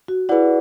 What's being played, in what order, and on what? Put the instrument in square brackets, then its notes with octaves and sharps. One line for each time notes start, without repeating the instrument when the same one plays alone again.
[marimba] F#4
[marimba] E4 [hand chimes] G#4 B4 D5 F#5